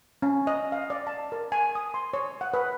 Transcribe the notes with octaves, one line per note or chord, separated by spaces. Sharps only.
C#4
D#5
F5
D5
A5
A#4
G#5
D#6
C6
C#5
F#5
B4